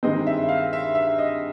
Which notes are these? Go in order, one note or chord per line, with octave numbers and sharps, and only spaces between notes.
G2 D#3 G#3 C4 D#5
E5
F5
E5
E5
D#5